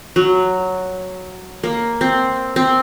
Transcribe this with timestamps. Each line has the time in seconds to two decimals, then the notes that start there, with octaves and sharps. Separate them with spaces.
0.16 F#3
1.63 A#3
2.01 C4
2.56 C4